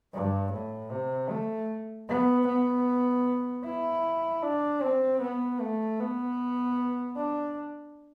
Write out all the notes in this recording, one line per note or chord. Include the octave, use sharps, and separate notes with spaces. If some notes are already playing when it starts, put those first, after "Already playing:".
G2
A2
C3
A3
B3
B3
E4
D4
C4
B3
A3
B3
D4